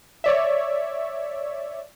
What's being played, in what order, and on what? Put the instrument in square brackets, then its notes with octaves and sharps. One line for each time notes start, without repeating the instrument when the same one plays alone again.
[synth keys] C#5 D5 E5